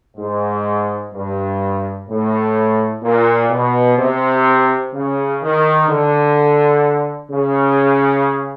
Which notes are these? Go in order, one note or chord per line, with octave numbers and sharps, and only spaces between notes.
G#2
G2
A2
A#2
B2
C3
C#3
D#3
D3
C#3